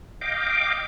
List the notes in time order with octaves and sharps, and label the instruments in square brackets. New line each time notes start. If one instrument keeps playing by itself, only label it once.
[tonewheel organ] D#5 F5 G5 D6